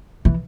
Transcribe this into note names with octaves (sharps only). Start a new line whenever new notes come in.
E3